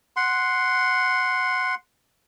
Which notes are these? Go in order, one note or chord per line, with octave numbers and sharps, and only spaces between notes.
F#5 C6